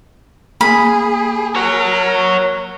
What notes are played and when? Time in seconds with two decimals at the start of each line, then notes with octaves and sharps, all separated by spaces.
0.61 A#3 G#4 B5
1.56 A#4 C#5 F#5